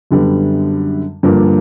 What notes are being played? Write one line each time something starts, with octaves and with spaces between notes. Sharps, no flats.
F#2 D3 G3 B3
G2 D3 F3 A#3 D4